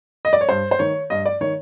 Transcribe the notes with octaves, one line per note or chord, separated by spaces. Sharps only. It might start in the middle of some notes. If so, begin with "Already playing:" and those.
D#5
D5
C#5
G2 C5
C5
D#3 C#5
G2 D#5
D5
D#3 C#5